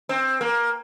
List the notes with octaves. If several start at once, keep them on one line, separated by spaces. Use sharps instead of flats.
C4
A#3